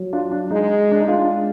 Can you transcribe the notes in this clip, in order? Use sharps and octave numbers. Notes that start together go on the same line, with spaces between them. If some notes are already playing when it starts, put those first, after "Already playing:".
Already playing: F#3
D4 F4
D4
G#3 D#4
D4
D#4
G#3 D4 F4